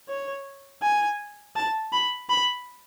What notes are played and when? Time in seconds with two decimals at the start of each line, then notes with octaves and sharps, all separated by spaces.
0.09 C#5
0.82 G#5
1.56 A5
1.93 B5
2.29 B5